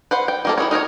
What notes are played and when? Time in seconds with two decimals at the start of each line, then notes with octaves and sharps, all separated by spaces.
0.11 B4 C5 F#5
0.28 G5
0.45 D#3 A#3 A4
0.58 E4 F4 G#4 C#5
0.71 D#4 A#4 C5 C#5